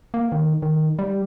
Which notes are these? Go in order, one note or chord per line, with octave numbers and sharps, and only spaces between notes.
A#3
D#3
D#3
G3